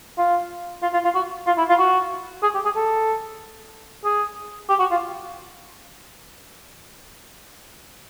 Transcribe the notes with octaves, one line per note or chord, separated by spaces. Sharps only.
F4
F4
F4
F4
F#4
F4
E4
F4
F#4
G#4
G4
G#4
A4
G#4
G4
F#4
F4